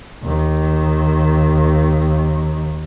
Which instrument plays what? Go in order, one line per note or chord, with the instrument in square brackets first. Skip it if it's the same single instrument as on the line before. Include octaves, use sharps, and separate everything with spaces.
[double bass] D#2 D#3